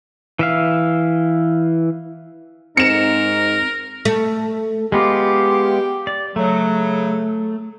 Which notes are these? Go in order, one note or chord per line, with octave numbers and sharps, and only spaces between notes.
E3 E5 F5
G#2 C4 D#4 A#4 C#7 E7
A3
G#3 B3 F4 G4
D5
C#3 F#3 A3